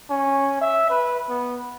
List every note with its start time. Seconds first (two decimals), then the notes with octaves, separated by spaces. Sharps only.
0.10 C#4
0.61 E5
0.90 B4
1.30 B3